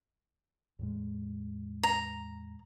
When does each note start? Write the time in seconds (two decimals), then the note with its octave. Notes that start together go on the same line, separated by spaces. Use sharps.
0.79 E2 A2 G#3
1.83 A#5